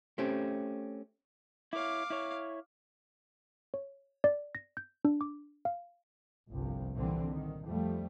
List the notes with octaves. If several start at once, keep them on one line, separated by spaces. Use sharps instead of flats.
A3 C4 C#4 G4
E4 C#5 F5 D6
E4 C#5
C#5
D5
A#6
G6
D4
D6
F5
G1 C2 F3
C2 A#2 D3 E3 G3 C4
D#3
F2 F3 G3 A3